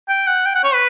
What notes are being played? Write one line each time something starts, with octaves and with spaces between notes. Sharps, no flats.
G5
F#5
G5
F#5
C#5
B4